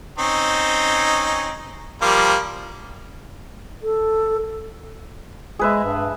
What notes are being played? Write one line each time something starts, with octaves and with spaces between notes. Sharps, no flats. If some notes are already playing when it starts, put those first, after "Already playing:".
C4 C#4 D#4
F3 G3 A#3
A4
G#3 G#4 B4 E5
G2